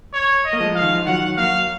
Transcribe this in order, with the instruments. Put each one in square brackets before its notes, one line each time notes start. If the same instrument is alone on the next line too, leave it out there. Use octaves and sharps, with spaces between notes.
[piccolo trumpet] C#5
D#5
[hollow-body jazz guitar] A#3
F3 G#3
[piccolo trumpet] F5
[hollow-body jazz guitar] D#3
F3
[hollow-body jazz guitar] D#3 F#3 [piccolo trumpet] F#5
[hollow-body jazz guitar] F#3 A#3 [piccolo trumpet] F5